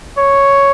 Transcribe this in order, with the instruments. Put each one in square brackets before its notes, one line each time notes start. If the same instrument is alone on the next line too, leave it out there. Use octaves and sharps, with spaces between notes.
[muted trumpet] C#5